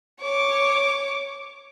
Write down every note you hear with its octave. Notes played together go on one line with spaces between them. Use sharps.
C#5 D6